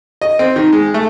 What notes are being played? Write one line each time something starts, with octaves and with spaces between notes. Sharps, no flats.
D#5
C4
D#3
G#3
A3